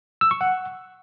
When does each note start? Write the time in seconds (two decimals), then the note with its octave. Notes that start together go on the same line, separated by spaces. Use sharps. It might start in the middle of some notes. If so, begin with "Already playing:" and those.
0.21 E6
0.31 C#6
0.41 F#5